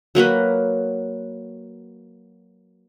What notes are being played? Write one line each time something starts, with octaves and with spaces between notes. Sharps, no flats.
F#3 A#3 F#4 B4